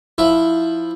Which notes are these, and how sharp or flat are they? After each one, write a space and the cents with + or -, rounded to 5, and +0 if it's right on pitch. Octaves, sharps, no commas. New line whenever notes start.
F3 +0 E4 +0